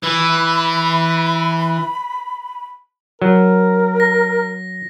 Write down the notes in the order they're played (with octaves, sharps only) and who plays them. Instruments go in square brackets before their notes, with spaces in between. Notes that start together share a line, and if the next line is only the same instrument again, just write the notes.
[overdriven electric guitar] E3 [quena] B5
[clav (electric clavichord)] F#3 [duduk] A#4
[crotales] A#6